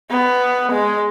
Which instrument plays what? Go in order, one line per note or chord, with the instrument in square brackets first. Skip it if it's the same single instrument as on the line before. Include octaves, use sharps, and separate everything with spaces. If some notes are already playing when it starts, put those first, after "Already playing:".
[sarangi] B3
G#3